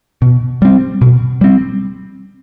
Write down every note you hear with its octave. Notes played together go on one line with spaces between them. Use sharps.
B2
G3 C4
B2
G3 C4